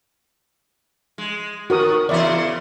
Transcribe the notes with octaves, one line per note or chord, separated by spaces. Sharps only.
G#3
D#3 F#4 A#4 D#6
E2 C#3 C5 D5 E5 A#5